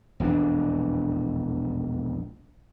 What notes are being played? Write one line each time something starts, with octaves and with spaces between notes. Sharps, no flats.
E1 A#1 F2 D4